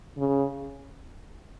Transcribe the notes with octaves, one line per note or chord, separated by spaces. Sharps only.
C#3